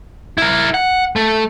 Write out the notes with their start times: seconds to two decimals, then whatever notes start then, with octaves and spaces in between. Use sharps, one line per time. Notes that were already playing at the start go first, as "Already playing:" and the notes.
0.38 E4 A#4
0.74 F#5
1.16 A3